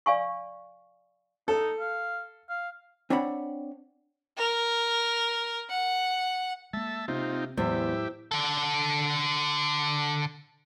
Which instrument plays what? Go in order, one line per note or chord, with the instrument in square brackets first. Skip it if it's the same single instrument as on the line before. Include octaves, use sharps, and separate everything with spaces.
[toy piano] D5 F5 G#5 C#6
[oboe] D#4 [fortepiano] A4
[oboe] F5
F5
[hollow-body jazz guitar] C4 D4 C#5 F#5 B5
[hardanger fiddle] A#4
F#5
[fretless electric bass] G#3 A#3 [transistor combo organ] E5 A5
[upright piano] C3 [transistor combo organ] C4 D#4 F4
[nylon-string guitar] E2 [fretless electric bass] A2 F#3 G#3 [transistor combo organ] G4 E5 [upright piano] C5
[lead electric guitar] D3 A4